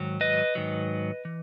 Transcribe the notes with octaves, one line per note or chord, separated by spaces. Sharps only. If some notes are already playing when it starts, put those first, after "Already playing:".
Already playing: G#2 D#3 F#3
B4 D#5
G#2 D#3 F#3
E3